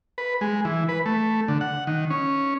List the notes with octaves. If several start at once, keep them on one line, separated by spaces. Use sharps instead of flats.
B4
G#3
E3
B4
A3
D3
F#5
D#3
C#4